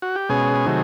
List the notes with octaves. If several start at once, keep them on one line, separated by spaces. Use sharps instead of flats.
F#4
G4
B2 G#3 C#4 G#4
C3 D#3 F#3 A3